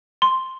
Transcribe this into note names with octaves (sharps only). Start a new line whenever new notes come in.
C6